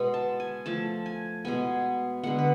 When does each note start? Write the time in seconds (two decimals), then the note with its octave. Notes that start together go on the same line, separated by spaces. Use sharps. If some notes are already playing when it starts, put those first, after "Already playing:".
Already playing: B2 G#3 B3
0.14 A5
0.40 G#5
0.66 F3 A3 A5
1.06 G#5
1.45 B2 G#3 B3 G#5
2.24 D3 G#3 B3 F#5
2.39 B4